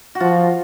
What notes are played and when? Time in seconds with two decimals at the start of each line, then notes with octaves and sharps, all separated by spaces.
0.15 F#4
0.20 F3 F4